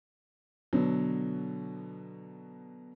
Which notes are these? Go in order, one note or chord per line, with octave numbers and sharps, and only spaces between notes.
B2 D3 F#3 B3